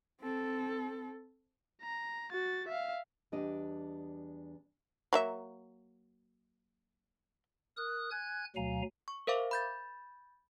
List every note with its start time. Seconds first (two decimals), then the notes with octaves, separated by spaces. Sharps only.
0.21 C4 A4
1.82 A#5
2.31 F#4 A6
2.68 E5 F5
3.32 E2 G3 D4 G4 D#5
5.13 F#3 A#3 E5
7.77 A#4 D#6 F#6
8.11 G#5 F#6 G#6
8.56 D2 B2 F#3 F5 G#5 A#5
9.08 C#6
9.27 A#4 C5 E5 F5 D6
9.51 B5 G6 A6